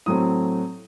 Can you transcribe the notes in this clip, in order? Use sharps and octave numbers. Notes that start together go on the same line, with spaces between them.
A2 F#3 A3 C4 D#6